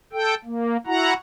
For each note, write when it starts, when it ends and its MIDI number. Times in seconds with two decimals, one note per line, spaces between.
0.13 0.34 69
0.13 0.34 79
0.44 0.77 58
0.87 1.13 64
0.87 1.13 66
0.87 1.13 78
0.87 1.13 82